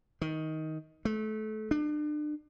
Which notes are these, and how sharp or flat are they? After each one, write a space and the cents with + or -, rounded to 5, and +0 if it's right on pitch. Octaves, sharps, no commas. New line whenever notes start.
D#3 +15
A3 -25
D4 +35